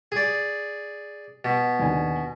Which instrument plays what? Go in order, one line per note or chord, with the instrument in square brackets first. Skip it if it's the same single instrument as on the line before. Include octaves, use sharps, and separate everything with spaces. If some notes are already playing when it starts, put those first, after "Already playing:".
[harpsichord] G#4 D5
B2
[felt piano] D#2 D3 G#5